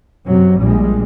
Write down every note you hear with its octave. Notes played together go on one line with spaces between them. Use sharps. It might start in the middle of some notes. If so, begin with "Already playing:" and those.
F#2 C3 F#3
A#1 G3 G#3